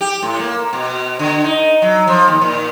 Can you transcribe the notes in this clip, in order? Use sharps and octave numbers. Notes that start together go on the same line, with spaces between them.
G4
A2
A#3
B2
D3
D#4
F#3
F3
D#2
A#2